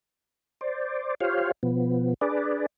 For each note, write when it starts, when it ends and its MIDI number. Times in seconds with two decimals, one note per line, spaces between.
0.61 1.15 72
0.61 1.15 74
1.20 1.52 65
1.20 1.52 67
1.20 1.52 72
1.20 1.52 73
1.20 1.52 77
1.63 2.14 47
1.63 2.14 53
1.63 2.14 59
2.21 2.66 62
2.21 2.66 68
2.21 2.66 71
2.21 2.66 74